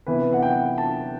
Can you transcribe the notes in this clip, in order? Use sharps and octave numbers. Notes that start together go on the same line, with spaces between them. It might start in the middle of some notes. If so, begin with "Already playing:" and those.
C3 E3 B3 E4 B4
F#5
G5
A5